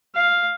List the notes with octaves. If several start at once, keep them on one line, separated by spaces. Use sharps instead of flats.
F5